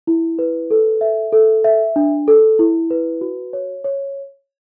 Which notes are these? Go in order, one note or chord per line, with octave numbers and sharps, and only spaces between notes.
E4
B4
A4
E5
A4
E5
D4
A4
E4
B4
F#4
C#5
C#5